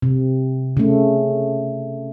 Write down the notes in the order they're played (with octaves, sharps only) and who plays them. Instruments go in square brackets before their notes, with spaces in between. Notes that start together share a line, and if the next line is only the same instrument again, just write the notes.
[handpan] C3
C#3 A3